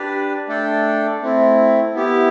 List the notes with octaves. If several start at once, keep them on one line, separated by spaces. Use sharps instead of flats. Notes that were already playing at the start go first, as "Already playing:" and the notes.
Already playing: D4 G4 B4 D5
A3 D4 A4 D5 G5
A3 C4 E4
B3 E4 G4